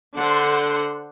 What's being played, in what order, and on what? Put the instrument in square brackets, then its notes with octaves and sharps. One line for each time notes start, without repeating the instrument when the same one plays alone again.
[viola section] D3 D4 C5 F#5 C6